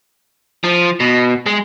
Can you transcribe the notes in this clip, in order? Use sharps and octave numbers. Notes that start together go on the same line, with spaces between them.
F3
B2
G#3